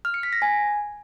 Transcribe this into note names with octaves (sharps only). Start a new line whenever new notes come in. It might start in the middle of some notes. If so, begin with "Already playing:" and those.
F6
C#7
B6
A#6
G#5